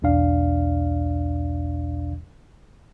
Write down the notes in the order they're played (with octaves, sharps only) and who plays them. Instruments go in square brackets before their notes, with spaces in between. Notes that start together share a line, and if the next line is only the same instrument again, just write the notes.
[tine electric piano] B1 E2 B2 D4 D5 F5